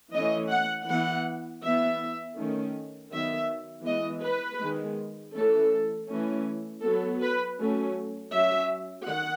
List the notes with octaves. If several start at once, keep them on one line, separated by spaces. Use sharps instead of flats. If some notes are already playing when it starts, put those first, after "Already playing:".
E3 A3 C#4 D#5
F#5
E3 B3 F#5
E3 B3 E5
D#3 A3 C#4
D#3 F#3 B3 E5
E3 G#3 B3 D#5
B4
D#3 G#3 B3
E3 A3 C#4 A4
E3 A3 C#4
F#3 B3 A4
B4
F#3 A3 C#4
F#3 C#4 E5
D#3 F#5